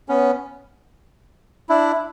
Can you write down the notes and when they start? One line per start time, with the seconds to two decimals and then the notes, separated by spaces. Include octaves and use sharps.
0.09 B3 C#4
1.69 D4 E4